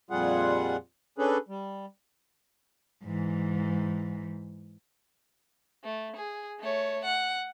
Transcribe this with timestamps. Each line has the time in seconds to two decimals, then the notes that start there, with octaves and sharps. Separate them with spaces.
0.10 F2 A#2 G3 F4 G#4 F#5
1.18 C#4 D4 G#4 A4 B4
1.49 G3
3.04 G#2 E3
5.84 A3
6.17 G#4
6.60 A3 C#5
7.05 F#5